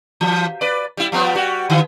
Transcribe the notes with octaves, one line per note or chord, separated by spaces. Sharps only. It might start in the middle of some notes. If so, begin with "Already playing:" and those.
E3
B4 D5
G3 E4
F3 G3 B3
G3 F#4
D3 E3